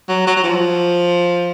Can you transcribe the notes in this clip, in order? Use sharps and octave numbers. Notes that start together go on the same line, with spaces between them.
F#3
F#3
F#3
F3